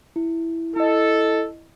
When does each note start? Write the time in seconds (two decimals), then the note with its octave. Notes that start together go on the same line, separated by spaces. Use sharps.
0.16 E4
0.76 E4 A4 D#5